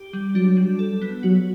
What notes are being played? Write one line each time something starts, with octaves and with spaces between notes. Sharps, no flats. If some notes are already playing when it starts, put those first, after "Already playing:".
Already playing: G4
G3
F#3 D4
G3
A4
B3
F#3 F#4